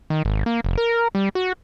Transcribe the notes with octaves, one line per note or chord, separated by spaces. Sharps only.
D#3
G#1
A#3
F1
A#4
G3
F#4